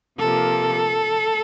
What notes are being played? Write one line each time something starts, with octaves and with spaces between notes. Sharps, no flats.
C3 F3 A#3 A4